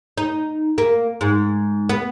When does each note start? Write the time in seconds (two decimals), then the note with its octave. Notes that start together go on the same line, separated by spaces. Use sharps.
0.18 D#4
0.78 A#3
1.21 G#2
1.89 B3